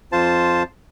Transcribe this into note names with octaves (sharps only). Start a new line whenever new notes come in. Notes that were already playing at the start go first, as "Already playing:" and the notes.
F2 F4 C5 A5